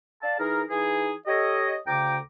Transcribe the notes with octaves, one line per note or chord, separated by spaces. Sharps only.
D5 F5 A5
E3 D#4 G#4 A#4
E3 D#4 G#4
G4 A4 C#5 D#5
D2 C#3 G5 A#5 D6